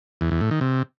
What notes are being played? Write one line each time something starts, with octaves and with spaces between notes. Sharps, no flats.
E2
E2
A2
D#3
C3